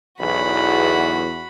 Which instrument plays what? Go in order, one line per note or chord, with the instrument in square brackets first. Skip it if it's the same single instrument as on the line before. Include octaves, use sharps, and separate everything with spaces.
[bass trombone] B1 [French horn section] E2 [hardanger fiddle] F#4 B5